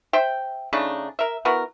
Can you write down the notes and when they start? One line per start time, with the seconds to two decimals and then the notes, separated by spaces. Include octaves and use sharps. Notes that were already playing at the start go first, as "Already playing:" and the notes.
0.13 C5 E5 G5
0.73 C#3 A3 D4 D#4
1.19 A#4 E5
1.45 B3 E4 F#4 A#4